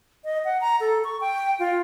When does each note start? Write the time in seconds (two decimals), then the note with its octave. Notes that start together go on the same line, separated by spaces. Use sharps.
0.24 D#5
0.45 F#5
0.61 A#5
0.80 A4
1.04 C#6
1.21 G5
1.59 F4